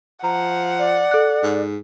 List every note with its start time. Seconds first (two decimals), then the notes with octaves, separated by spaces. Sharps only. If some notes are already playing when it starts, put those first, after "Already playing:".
0.24 F3 F#5 A#5
0.79 D5
1.11 A4 F#6
1.43 G#2